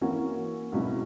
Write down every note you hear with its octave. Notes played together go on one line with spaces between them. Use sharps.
E3 A#3 C#4 F#4
C#2 B2 F#3 C#4 E4